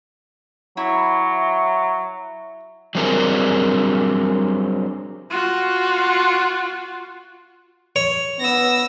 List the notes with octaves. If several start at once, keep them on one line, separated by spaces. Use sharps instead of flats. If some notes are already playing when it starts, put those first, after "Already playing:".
F#3 E4
F#3 G3 C4 D4 G#4 A#4
F4 F#4
C#5
B3 E6 A#6